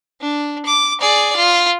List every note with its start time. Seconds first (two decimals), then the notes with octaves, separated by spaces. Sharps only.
0.21 D4
0.66 D6
1.01 G#4 D5
1.36 F4